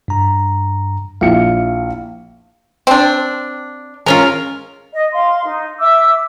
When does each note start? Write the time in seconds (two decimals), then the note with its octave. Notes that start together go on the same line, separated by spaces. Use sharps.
0.08 G2 A#5
1.21 A#1 E4 F5 C#7
2.87 C4 D4
4.06 G#3 C#4 F4 A#4
4.92 D#5
5.12 F5 C6
5.44 D#4
5.79 E5 D6 E6